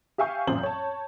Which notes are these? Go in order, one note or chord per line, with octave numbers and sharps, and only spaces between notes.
G4 E5 F5 G#5 C#6 G6
A1 F#2 A#2 C5 G6 F#7
C#5 A5